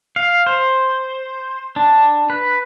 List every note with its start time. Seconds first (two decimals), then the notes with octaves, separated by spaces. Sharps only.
0.16 F5
0.46 C5
1.76 D4
2.30 B4